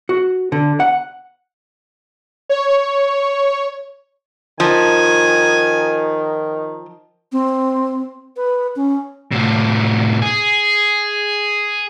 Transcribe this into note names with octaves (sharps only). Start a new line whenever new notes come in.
F#4
D3
F#5
C#5
D#3 F3 G#5
C4
B4
C#4
A2 C3
G#4